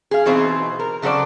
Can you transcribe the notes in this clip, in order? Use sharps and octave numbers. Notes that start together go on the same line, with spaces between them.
G#4 F5
B2 E3 C4 D#4 G#4 C5
A#4
C#3 F#3 A4 C5 D5